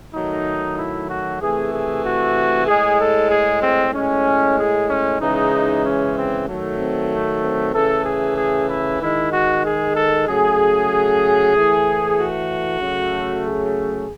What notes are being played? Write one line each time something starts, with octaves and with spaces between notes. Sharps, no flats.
D#3 F#3 A3 D#4
E4
F#4
C3 E3 A3 G#4
G#4
F#4
A2 G#3 G#4
A4
G#4
C4
A2 G#3 C#4
G#4
C#4
C#3 E3 G#3 D#4
C#4
C4
D#3 F#3 A3
C4
C4
C#3 E3 A3 A4
G#4
G#4
E4
D#3 G#3 E4
F#4
G#4
A4
C#3 F#3 A3 G#4
A2 E3 A3
F#4
C#3 F#3 A3
G#4